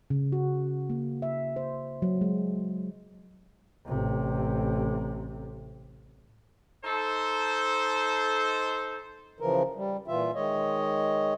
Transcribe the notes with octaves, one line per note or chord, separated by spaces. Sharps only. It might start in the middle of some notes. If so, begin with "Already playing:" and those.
C#3
F#4
A#3
E5
C5
F#3
G#3
A1 C3
D#4 A4 C5
C#3 E3 F3 A#4
G3
A#2 E3 F4 E5
D#3 G#3 C#5 D#5